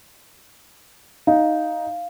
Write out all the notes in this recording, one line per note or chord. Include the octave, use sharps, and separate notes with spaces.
D#4 F5